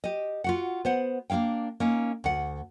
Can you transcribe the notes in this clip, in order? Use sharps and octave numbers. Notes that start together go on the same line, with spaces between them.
G4 D#5
F4 F#4 F#5
B3 C5 F#5
A#3 D4 E4 F5 G5
A#3 C#4 D#4
D2 F#5